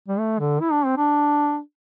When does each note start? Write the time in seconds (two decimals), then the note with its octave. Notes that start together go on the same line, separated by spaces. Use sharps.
0.08 G3
0.19 A3
0.39 D3
0.60 E4
0.72 D4
0.86 C4
0.97 D4